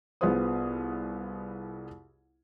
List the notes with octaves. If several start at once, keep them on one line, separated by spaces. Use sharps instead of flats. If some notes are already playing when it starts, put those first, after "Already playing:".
C2 B3 F4 G#4 C5 D#6